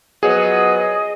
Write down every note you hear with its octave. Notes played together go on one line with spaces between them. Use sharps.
F3 F#3 B3 G#4 D#5